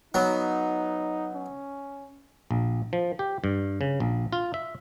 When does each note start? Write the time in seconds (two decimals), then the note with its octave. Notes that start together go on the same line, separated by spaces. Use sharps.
0.14 F#3 B3 D#4
1.34 C#4
2.51 A#1
2.93 F3
3.19 G4
3.44 G2
3.81 C#3
4.00 A#1
4.33 F4
4.54 E5